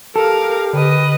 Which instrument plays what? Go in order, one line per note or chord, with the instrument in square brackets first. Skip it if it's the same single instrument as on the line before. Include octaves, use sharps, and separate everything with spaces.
[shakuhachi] G4 [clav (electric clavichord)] A4 [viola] A#4 F5
[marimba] D3 [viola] B4 D#5